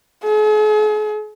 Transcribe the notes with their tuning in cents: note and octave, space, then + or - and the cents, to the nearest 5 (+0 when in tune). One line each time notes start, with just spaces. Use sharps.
G#4 +45